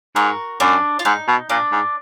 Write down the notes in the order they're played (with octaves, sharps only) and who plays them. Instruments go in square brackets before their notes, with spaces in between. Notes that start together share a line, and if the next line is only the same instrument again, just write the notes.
[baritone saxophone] G#2 [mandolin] F#4 A#4
[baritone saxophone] F#2 [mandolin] D4
[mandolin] F4
[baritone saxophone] G#2 [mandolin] D#4
[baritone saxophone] B2
[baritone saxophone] A#2 [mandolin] D4
[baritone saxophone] G#2